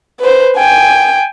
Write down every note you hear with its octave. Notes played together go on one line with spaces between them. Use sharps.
B4 C5
G5 G#5